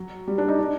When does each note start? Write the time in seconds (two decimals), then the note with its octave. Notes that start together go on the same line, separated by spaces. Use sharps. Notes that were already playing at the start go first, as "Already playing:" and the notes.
Already playing: F#3
0.28 G3
0.38 D4
0.48 D#4
0.59 D4